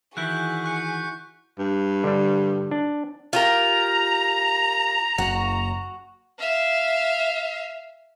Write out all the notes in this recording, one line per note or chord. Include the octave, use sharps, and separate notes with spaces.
D#3 E3 E4 F#4 G#4 F#6 G6 B6
C#6 F#6 C#7
G2
D3 G3
D4
F4 G4 A#4 A#5
F#1 F#4
E5 F5